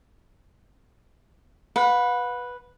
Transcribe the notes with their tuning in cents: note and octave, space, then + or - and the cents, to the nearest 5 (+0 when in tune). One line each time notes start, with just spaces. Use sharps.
B4 -5 F#5 -45